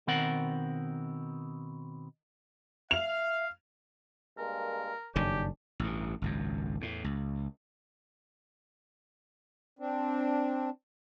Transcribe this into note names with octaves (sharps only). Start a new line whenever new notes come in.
B2 D#3 C4 A#4 F#5
E5 F5 F7
G2 G#3 A#3 A#4
F#1 B1 G2 D#3 C#4 D4 G4
A1 G2
G#1 C#2 F#2
E2 A2
C#2
C4 D4